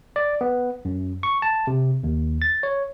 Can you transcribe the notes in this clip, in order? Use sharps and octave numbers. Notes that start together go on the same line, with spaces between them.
D5
B3
F#2
C#6
A5
C3
D#2
A6
C#5